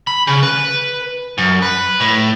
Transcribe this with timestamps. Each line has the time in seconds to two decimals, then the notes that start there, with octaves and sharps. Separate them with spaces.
0.07 B5
0.27 C#3
0.43 B4
1.38 F#2
1.62 B4
2.00 A2